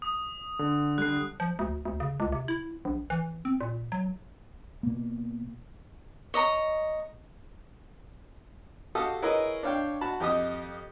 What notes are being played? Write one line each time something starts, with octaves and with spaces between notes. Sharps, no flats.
D#6
D3
D3 G3 F#6 C7
F3
D2
D2
C#3
C#2
C3
E4
A#1
E3
C4
A#2
F#3
B2 A#3
C#5 D#5 A#5
F#4 G4 A4 F5 D#6
E4 G#4 A#4 B4 C#5 D#5
D4 C#5 F5 G5
F#4 A5 B5
F2 G4 D#5 D#6